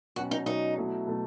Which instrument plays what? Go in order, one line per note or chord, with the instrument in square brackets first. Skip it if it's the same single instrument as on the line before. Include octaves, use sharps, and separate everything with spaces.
[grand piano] B2 F#3 C#4 [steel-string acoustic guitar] F#4
[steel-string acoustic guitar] D#4
[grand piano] B2 F#3 C#4 [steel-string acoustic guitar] D#4
[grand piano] B2 F#3 A3 E4
B2 F#3 A3 E4